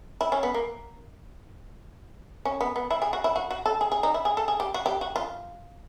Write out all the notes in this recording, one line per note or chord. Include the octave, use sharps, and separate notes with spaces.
E4
C#4
B3
A#3
C#4
B3
B3
E4
G#4
F#4
E4
F#4
F#4
A4
G#4
G#4
D#4
E4
G#4
A4
G#4
G4
F#4
G4
F#4
F4